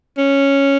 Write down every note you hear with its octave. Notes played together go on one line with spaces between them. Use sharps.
C#4